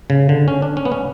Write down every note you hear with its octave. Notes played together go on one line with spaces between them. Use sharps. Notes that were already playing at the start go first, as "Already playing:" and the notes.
C#3
D3
C#4
D4
C#4
B3
C#4